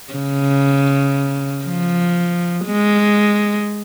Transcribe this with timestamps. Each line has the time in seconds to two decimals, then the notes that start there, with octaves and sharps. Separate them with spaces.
0.14 C#3
1.65 F3
2.66 G#3